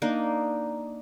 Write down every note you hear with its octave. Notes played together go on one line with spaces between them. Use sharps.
A#3 D4 D#4